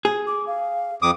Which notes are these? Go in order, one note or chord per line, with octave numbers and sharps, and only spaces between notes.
G#4
D6
F5
F2 D6 D#6